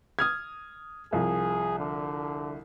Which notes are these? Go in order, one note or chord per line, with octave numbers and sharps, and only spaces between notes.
D#6 F6 G#6
C2 F3 G#4
D3